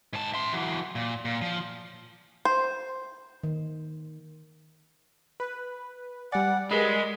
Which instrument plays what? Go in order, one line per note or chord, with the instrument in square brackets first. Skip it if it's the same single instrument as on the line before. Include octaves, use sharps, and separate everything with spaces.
[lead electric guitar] G#2 A5
E5 C6
E3 F#3
A#2
A#2
F3
[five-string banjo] C5
[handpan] D#3
[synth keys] B4
[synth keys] G3 D5 [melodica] F#5 [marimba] G#5 F#6
[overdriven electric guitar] G#3 [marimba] G#4 A#4 B4 [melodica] B5